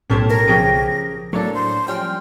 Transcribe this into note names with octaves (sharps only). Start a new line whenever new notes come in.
B1 A2 C#4 G4 A4 C5 A5 G#6
A#4 A#6
C#3 F3 C#4 G4 G#4 D7
A2 F#3 A#3 D4 A4 C#5
C5
F3 G3 C#4 G5 C6 F6